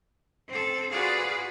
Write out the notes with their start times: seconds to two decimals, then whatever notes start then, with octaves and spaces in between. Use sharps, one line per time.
0.47 C4 A4
0.90 F4 F#4 G#4 B4 D5 F5